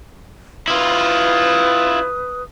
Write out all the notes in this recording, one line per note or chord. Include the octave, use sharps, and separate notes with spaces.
E4 F4 B4 D#6